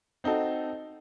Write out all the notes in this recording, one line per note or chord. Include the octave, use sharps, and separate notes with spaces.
C4 D#4 F#4 A4